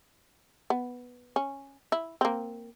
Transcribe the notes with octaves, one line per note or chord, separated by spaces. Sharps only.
B3
C#4
E4
A#3 C4